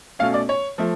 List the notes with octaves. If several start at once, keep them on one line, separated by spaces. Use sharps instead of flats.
B2 A3 C#4 F5
D5
C#5
F3 A3